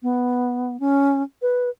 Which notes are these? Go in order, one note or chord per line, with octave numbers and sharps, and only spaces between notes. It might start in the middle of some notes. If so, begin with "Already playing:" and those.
B3
C#4
B4